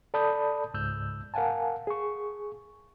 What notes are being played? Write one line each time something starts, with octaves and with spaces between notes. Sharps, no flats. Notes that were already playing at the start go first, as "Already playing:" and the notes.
A4 D5 A5 B5 D#6 G6
C#2 G#2 E6 G6
A#4 F5 F#5 G#5 A5
G#4 C#6